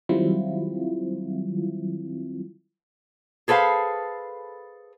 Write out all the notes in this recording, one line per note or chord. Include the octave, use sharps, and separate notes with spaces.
D#3 F#3 G3 C4 E4 F4
G#4 A4 B4 C5 F5